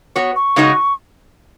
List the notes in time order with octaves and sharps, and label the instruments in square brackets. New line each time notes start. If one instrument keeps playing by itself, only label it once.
[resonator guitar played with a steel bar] B3 F#4 C#5
[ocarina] C#6
[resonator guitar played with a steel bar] C#3 G#3 D#4 F#4 D#5